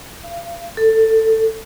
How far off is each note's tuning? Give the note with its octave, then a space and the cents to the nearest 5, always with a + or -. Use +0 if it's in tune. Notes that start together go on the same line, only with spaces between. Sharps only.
F5 -35
A4 +15